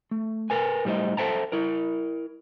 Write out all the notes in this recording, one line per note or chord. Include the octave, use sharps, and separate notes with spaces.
A3
A#4 B4 G#5
A2 G3 C#4 C5 D#5
A4 C5 E5 G5 A5 A#5
E4 A#4